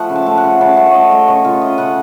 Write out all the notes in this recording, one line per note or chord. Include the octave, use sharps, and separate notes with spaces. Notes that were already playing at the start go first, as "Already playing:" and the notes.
Already playing: F3 A3 F#5
C#3
A5
A3
F#5
C#3
C#3 A5
A3 F#5
C#5
A3 D#5
A3 D#5
C#3 C#5
C#3 F4
A3 D#5
C#3 F#5